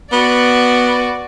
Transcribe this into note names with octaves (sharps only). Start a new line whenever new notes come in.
B3 F#4 D5